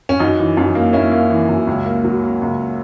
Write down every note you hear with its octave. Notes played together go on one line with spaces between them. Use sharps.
C#4
F#2 D#4
E3
F#2
A#3
A#3 C#4 E4
A#3
E3
F#2
C#2
A#3
F#3
A#3
C#2